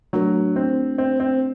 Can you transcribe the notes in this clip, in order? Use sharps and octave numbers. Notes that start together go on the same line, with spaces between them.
F#3 A3 D4 F#4 A#4
C4
C4
C4